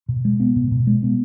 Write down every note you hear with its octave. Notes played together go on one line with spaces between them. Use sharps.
B2
G#3
B3
B2
B2
G#3
B3